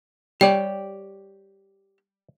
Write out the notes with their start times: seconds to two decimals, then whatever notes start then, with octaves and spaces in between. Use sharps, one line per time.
0.41 G3 G4 C#5 D5 G5